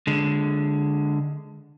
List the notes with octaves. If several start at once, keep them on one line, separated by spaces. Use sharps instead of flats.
D3 G#3